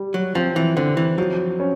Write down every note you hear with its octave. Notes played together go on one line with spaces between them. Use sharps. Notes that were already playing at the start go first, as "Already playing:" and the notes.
Already playing: G3
F#3
F3 C4
E3
D3 C4
E3
F3 F#3
C#4